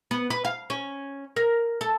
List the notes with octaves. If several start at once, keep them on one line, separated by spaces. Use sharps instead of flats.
B3
B4
F5
C#4
A#4
A4